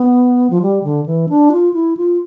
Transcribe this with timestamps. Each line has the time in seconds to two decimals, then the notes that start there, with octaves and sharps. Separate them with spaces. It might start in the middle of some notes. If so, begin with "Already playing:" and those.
Already playing: B3
0.50 F3
0.62 G3
0.84 D3
1.06 E3
1.29 D4
1.52 F4
1.74 E4
1.97 F4